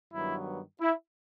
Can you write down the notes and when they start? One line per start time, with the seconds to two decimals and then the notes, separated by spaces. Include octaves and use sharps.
0.13 G2 D#3 F#3 B3 E4
0.82 E4